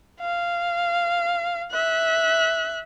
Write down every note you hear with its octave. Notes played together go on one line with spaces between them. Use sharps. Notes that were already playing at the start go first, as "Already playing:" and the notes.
F5
E5 F#6